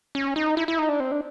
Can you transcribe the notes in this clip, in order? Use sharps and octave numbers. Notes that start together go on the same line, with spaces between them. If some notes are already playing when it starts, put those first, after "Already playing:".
C#4
D#4
E4
E4
D#4
D4
C4
D4